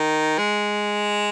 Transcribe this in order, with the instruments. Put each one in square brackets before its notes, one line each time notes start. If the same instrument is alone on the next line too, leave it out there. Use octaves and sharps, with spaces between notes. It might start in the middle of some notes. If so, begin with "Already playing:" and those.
Already playing: [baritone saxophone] D#3
G#3